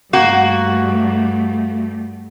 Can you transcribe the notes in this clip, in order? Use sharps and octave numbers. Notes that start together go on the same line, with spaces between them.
G2 A3 A#3 F#4